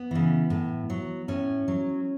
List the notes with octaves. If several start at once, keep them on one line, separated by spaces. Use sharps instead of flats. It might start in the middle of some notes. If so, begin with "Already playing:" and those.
Already playing: B3
C#3 E3
A2
F#3
A2 C#4
F#3